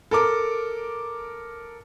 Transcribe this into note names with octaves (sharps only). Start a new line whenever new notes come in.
A4 A#4 D6